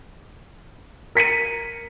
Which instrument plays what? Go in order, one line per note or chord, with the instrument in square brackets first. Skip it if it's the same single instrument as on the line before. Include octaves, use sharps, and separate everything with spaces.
[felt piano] A#4 B6 C#7 D#7